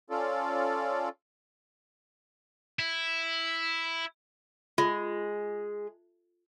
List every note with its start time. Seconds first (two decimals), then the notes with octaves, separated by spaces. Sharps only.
0.10 C#4 F4 A4 D5
2.79 E4
4.78 G#3 F4